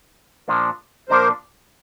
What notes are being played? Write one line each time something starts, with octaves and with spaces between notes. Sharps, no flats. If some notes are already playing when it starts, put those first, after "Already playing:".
A#2 F3 A#3 D4
A#2 F3 A#3 D4 A#4 C5